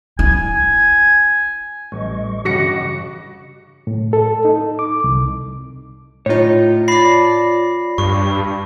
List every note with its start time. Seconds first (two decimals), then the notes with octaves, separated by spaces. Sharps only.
0.19 E4 G#5
1.92 A1 G3 D#5 C#6
2.45 G2 C#3 E3 F#4 D#5 D6 A#6 C#7
3.87 A2
4.13 A4
4.45 D#4
4.79 D6
5.04 C2
6.26 A2 D#4 F4 C#5
6.88 D5 A5 B5 A#6 C7
7.98 G2 C#6